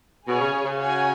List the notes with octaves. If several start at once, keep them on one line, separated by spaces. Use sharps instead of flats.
B2 G#4 C#5 G#5
C#3
C#3
C#3
F#4 C#5 G#5